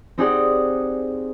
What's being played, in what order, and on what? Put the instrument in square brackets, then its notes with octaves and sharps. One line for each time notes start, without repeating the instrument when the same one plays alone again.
[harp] C4 D#4 G4 G#4 D5 F#5